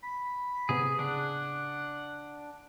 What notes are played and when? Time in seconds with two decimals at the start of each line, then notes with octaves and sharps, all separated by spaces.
0.03 B5
0.69 A2 C3 B3 G#4
0.99 C#3 D4 F#5